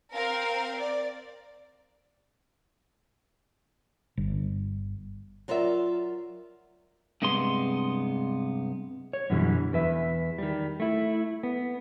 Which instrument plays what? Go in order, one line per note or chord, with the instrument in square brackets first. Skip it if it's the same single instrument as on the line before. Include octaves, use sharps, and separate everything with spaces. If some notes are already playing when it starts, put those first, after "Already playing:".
[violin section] C4 A#4 F5
D5
[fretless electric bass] G1
[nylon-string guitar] F#3 F4 A#4 D5 E5
[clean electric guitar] G2 C3 G#3 B3 C6
[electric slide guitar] C#5
F#2 B2 D3 E3 G3
E2 B4 E5
D#3 G3
A3 E4
B3